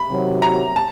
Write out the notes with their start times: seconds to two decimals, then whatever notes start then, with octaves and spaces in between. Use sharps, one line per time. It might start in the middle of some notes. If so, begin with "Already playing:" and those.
Already playing: B5
0.09 C3 D#3 F#3
0.42 A#5
0.76 A5